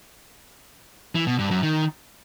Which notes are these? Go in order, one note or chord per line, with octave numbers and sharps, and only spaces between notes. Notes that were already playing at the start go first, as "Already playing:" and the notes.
E3
B2
G2
F#2
D#3